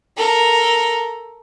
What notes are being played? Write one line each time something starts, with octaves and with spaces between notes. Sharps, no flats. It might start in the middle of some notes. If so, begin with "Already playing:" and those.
A4 A#4